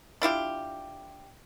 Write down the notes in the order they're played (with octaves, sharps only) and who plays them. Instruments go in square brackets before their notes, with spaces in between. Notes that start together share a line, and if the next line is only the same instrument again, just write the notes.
[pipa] D4 E4 F4 G4